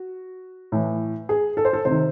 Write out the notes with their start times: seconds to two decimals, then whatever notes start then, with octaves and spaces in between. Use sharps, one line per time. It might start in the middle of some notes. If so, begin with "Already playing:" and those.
Already playing: F#4
0.72 A2 E3
1.29 G#4
1.57 A4
1.65 C5
1.73 A4
1.85 C3 C5
1.90 D#3